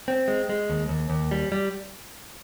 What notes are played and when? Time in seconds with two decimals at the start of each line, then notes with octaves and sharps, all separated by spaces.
0.08 C4
0.28 G#3
0.49 G#3
0.70 D#2
0.89 D#2
1.10 D#2
1.31 G3
1.52 G3